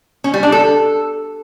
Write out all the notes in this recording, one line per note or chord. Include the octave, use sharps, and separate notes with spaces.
C#4
G3
D4
A4